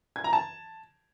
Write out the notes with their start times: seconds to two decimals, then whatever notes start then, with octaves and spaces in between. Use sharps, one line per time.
0.16 G#6
0.24 A#5
0.33 A5